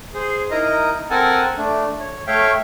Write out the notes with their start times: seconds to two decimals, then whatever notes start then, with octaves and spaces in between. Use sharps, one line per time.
0.14 G#4 C5
0.51 D#4 E4 A#4 D#5 A#5
1.10 C4 A4 A#4 F#5 G#5 A5
1.57 A3 D4
2.00 C#5
2.27 A3 C#5 E5 F5 G5